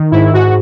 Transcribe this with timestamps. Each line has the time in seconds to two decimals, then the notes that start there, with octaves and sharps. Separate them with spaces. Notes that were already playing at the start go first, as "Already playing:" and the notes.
Already playing: D#3
0.11 G#2 E4
0.33 G#2 F#4